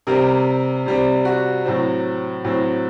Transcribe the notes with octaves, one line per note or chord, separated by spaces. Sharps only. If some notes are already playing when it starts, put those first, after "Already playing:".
C3 G3 C4 A#4
C3 G3 C4
F#4
A2 F#3 C4
A2 F#3 C4